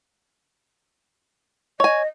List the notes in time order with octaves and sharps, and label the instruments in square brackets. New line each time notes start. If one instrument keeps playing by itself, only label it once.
[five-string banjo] C#5 G#5 [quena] D#5